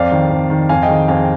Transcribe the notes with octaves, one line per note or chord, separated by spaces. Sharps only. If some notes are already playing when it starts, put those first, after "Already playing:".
Already playing: F2 D5 F5
D#3
F2
D#3
F2 F5 G#5
D#5 G5
D#3
F2 F5 G#5